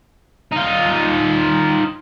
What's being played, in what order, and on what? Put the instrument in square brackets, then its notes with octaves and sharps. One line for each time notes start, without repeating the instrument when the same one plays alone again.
[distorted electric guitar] D#4 F4